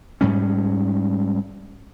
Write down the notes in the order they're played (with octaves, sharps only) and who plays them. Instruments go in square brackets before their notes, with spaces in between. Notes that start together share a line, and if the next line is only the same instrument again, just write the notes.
[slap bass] G#2 G3 C#4